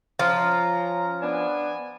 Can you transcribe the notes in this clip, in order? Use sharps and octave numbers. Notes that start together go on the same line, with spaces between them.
F3 C#4 A#5
B3 D4 G#5